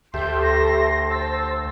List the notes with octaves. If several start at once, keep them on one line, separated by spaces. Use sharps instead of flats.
D2 A3 G4 A4 E5 G5 C6 G6
A#6
C5 A5 E6